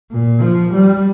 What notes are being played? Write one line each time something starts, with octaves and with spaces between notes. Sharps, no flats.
A#2
F3
G3